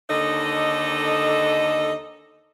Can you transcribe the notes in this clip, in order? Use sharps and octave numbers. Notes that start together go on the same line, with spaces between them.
D#2 D3 D#4 A4 D#5